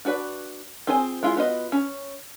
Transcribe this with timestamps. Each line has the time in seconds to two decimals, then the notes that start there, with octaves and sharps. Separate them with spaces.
0.05 D4 F#4 B4 D5
0.87 C4 F4 G#4 C5 G#5
1.23 G#3 E4 F4 G#4
1.37 B3 F4 F#4 D#5
1.72 C#4